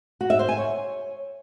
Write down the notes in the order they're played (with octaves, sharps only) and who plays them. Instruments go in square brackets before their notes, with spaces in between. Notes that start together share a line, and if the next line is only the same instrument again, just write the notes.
[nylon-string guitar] F#4
E5
C5
G#5
C#5